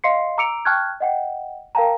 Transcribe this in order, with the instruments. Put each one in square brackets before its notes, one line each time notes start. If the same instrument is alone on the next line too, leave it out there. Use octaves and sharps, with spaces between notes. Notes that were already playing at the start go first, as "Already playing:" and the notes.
[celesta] D#5 F5 C6 C7 C#7
A#5 D6 E6 C#7 D7 F7
G5 A5 C#6 F6 F#6 G#6
D#5 F#5 G5
A#4 F5 G5 A5 A#5